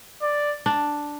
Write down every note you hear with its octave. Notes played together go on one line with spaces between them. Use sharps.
D5
D4